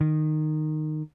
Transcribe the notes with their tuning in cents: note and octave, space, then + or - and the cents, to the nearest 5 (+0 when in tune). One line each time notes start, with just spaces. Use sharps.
D#3 -15